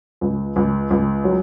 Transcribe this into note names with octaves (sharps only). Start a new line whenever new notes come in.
C#2
C#2
C#2
F#3